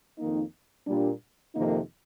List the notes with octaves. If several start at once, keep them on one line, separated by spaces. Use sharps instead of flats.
F2 D#3 A#3 D#4
A#2 G3 D4
F2 C3 D#3 A#3 D#4